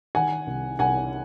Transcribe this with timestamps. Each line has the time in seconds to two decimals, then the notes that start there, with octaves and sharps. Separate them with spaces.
0.15 D#3 F#5 G#5
0.47 C2
0.79 C2 F#5 G#5